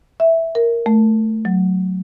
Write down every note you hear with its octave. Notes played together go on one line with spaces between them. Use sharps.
E5
A#4
A3
F#3